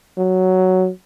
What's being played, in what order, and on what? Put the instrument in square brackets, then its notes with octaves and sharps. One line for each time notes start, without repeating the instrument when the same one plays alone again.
[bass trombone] F#3